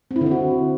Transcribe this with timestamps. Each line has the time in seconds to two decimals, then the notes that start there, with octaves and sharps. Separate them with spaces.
0.11 C4
0.16 E4
0.21 D3
0.26 C4
0.31 F#4